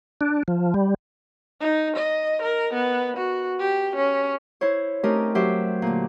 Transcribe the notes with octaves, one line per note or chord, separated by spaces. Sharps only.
D4
F3
G3
D#4
D#5
A#4
B3
F#4
G4
C#4
E4 C5 C#5
A3 C4 C#4 D#4 G4 A#4
F#3 G4 C5 E5
A#2 D3